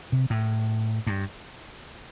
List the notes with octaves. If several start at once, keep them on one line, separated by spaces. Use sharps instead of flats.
C3
A2
G2